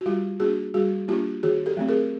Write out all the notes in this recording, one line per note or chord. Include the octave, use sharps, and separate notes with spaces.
F#4
G3 F4 G4
A#3 D4 F#4 G#4
G3 F#4 G#4
A#3 D4 F4 G4
D#3 F#4 G#4
G4 A4
F#3 A3 C4
G#4 A#4